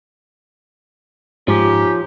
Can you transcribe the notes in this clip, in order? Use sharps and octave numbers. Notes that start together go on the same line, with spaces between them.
G#2 F3 C#4 D#4 G4